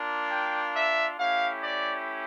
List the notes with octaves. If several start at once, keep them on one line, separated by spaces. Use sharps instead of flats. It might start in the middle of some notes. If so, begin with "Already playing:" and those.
Already playing: A#3 D4 F4
G5
E5
A3 C#4 E4 G4 F5
D5